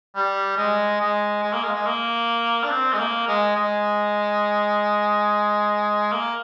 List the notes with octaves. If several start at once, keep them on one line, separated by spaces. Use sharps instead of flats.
G3
G#3
G#3
G#3
A#3
G#3
G#3
A#3
D4
C4
G#3
A#3
G#3
G#3
A#3